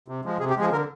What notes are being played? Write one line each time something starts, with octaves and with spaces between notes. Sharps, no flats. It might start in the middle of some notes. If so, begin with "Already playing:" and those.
C3
F3 G#3
C3 G#4
G4
F3 G#3 G#4
D3 A#4